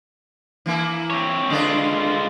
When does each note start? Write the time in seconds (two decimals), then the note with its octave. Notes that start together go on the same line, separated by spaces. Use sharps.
0.66 E3 A#3 E4
1.10 C4 C#5
1.50 D3 G#3 D4 F4 B4